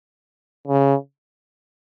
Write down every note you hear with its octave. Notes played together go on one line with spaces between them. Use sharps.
C#3